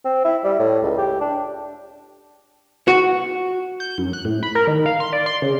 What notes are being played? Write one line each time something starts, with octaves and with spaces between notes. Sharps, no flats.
C4
E4
G3
A2
C#2
G4
D4
F#4
G6
F#2
F#6
A2
B5
A#4
D#3
F5
C6
D5
C6
C#3